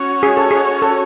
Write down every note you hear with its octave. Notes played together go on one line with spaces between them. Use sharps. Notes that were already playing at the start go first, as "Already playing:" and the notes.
Already playing: C#4 F#4 C#5
G#4
A4
G#4
A4